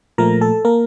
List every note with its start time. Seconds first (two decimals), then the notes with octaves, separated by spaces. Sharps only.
0.18 A#2 F3 A3 A#4 A#5
0.41 A4 A5
0.65 A#3 A#4